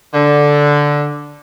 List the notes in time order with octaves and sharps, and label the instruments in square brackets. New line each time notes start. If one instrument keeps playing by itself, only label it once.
[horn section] D3